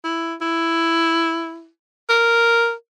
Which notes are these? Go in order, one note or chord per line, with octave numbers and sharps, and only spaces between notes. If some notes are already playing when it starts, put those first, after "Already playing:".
E4
E4
A#4